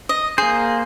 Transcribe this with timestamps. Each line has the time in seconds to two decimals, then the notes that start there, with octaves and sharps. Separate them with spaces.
0.09 D#5
0.38 A#3 G#4 C5